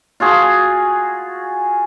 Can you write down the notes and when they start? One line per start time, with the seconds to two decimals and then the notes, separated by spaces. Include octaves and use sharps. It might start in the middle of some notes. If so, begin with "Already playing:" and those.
0.20 F4 F#4 G#4